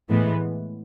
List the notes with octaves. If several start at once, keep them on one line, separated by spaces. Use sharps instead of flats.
A2 E3 G#3 B3